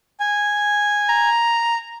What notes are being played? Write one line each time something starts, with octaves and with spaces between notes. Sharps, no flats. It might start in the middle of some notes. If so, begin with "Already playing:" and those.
G#5
A#5